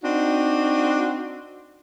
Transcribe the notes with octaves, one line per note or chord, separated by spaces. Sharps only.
C4 D4 D#4 F#4